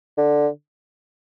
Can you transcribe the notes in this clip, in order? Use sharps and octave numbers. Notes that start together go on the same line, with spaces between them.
D3